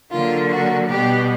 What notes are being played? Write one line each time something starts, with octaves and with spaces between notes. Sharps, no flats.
D3 F#3 A#3 F4
F#4
B2 G3 B3 G4